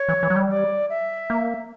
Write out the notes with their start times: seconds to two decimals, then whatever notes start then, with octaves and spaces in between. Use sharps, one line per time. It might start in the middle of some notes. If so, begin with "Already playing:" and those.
Already playing: C#5
0.09 E3
0.23 E3
0.30 F#3
0.36 G3
0.50 D5
0.90 E5
1.30 A#3